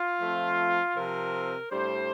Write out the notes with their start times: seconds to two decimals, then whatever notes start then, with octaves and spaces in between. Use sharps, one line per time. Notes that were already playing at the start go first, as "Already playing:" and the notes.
Already playing: F4
0.21 F3 A3 C4
0.96 C3 F3 C4 A#4
1.70 A2 G3 D4 C5